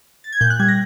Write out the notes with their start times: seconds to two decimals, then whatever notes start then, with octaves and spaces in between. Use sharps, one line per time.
0.24 A6
0.33 G#6
0.41 A#2 G6
0.50 F#6
0.59 G3 G#6
0.68 A#6